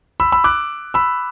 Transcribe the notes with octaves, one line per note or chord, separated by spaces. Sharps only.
B5 E6
B5 E6
D6 F#6
B5 E6